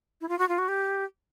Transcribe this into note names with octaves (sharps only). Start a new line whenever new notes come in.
E4
F4
F#4
F4
F#4
G4